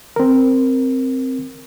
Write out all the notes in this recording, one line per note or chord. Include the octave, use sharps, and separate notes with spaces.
C4 A#4